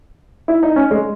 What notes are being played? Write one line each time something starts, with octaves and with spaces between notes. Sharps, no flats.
E4
D#4
C#4
G#3